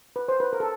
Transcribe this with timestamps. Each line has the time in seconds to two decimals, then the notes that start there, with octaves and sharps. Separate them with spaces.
0.16 B4
0.28 C5
0.40 B4
0.53 A#4
0.60 A4